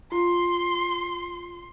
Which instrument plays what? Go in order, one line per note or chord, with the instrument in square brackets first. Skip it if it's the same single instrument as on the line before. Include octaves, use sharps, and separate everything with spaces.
[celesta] F4 [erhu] C6